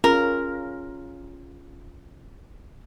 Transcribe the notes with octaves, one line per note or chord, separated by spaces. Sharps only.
C#4 F4 G#4 A#4